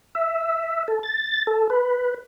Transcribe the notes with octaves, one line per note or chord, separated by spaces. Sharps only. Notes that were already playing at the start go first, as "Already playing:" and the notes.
E5
A4
A6
A4
B4